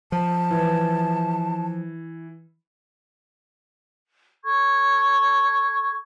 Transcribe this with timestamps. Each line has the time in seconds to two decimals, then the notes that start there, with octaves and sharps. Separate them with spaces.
0.12 F3 A5
0.51 E3
4.44 A4 C#6 G#6